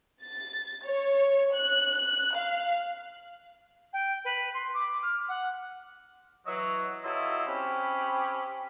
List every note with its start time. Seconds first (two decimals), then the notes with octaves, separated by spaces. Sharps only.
0.22 A6
0.84 C#5
1.53 F#6
2.34 F5
3.93 G5
4.25 B4
4.54 C6
4.74 D6
5.02 F6
5.29 F#5
6.47 E3 F#3 C#5 D#5 E6
7.04 F#3 E4 F4 A4 D#5
7.46 C4 C#4 G4 B5